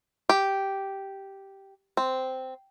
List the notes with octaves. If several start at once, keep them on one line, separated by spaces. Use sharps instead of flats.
G4
C4